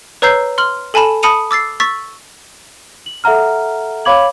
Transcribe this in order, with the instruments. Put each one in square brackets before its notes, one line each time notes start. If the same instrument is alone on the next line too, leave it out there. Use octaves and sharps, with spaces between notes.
[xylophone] B4 C#5 A#5 E6 G6 C7
C6 F6 F#7
A4 G#5 A5 B5 E7
A5 B5 D#6 C#7 D#7 F7
D6 E6 A6 C7
C#6 E6 A6 B6
[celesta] F#7
A4 E5 F#5 A#5 F6
C#5 F5 B5 D6 G#6 F#7